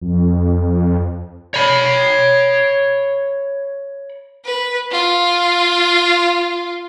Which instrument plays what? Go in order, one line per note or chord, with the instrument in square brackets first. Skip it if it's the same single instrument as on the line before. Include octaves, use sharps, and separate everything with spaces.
[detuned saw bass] F2
[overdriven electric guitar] C#5 B5
[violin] B4
F4